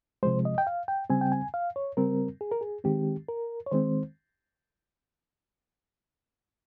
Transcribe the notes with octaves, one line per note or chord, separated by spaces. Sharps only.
C3 F3 G#3 C5
D#5
G5
F5
G5
C#3 G3 C4 G#5
G5
G#5
F5
C#5
C#3 G3 C4 A#4
G#4
A#4
G#4
D#3 G#3 C4 G4
A#4
C#5
D#3 G#3 C4 C5